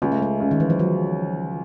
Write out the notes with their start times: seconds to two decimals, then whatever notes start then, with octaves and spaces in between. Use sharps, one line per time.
0.02 C#2 G#3
0.12 A3
0.22 G#3
0.40 C#3
0.51 D#3
0.60 E3
0.70 F3
0.79 F#3